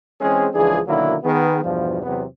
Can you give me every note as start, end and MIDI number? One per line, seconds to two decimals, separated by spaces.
0.21 0.48 52
0.21 0.48 56
0.21 0.48 60
0.21 0.48 61
0.21 0.48 68
0.54 0.79 37
0.54 0.79 52
0.54 0.79 53
0.54 0.79 62
0.54 0.79 68
0.88 1.16 47
0.88 1.16 50
0.88 1.16 51
0.88 1.16 54
0.88 1.16 58
0.88 1.16 64
1.24 1.63 51
1.24 1.63 59
1.24 1.63 68
1.63 2.03 40
1.63 2.03 43
1.63 2.03 47
1.63 2.03 53
2.03 2.24 40
2.03 2.24 48
2.03 2.24 54
2.03 2.24 59